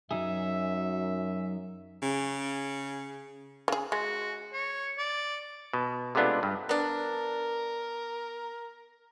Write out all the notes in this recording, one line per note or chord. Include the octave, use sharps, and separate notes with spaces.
F#2 F#3 D#4 G#4 E5
C#3
C#3 G#4
G#3 F#4
C#5
D5
B2
C3 G#3 A3 B3 D4 F4
G2
B3 D4 A#4